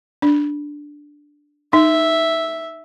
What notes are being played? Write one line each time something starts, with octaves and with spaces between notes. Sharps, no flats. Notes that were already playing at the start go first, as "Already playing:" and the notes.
D4
D#4 E5